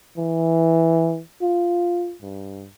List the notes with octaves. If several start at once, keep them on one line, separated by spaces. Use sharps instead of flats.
E3
F4
G2